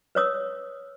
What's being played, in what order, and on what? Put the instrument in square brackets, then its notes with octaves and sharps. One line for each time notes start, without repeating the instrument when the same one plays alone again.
[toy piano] B4 C#5 D#6 E6